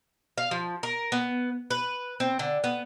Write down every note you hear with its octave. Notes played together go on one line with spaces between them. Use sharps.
F5
F3
A#4
B3
B4
C4
D3
B3